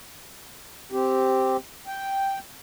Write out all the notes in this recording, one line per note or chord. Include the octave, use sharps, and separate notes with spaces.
C4 G4
G5